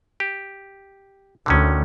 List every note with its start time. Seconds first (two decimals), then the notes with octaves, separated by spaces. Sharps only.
0.20 G4
1.46 D2 D3 D#3 C#4